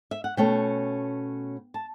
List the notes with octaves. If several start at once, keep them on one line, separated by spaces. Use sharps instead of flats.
E5
F#5
B2 A3 C#4 G5
A5